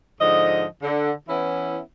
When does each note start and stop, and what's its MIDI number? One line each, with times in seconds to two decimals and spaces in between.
0.21 0.65 44
0.21 0.65 50
0.21 0.65 53
0.21 0.65 75
0.82 1.11 50
1.28 1.79 52
1.28 1.79 59
1.28 1.79 61
1.28 1.79 64